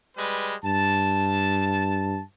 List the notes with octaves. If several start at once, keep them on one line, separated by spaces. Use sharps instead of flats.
G3 G#3 B4
G2 A5